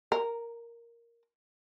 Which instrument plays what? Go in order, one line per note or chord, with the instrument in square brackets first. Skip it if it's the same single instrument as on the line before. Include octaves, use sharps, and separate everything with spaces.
[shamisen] A#4